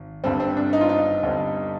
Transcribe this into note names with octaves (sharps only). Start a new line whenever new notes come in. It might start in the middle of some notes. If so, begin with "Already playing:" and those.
Already playing: G#1
G1 G2 D3 G3 C4
C4
D4
D#4
F4
D#4
G1 G2 D3 G3 C4